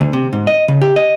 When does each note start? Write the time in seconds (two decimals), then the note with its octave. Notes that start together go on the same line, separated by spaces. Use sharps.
0.01 D2
0.13 C3
0.33 G#2
0.47 D#5
0.68 C#3
0.82 G4
0.96 D#5